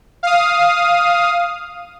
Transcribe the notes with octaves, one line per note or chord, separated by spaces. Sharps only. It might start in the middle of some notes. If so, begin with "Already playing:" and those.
F5 D#6